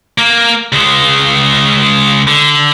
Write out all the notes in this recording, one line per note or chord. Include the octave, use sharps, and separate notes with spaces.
A#3
C#2 G#3
D3